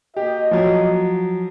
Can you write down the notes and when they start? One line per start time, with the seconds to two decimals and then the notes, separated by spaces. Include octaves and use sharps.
0.17 A#3 F#4 G4 D#5
0.51 F3 F#3